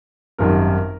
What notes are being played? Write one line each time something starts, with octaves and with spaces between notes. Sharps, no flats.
G#1 F#2 D#3 G3 A#4